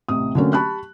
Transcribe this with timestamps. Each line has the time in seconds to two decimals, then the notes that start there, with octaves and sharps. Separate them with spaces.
0.08 A1 C3 D#6
0.35 D3 F#3 A3 A#3 C4 C#4
0.53 G4 A5 B5 C#6 F#6